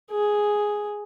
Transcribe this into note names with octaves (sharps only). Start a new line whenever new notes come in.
G#4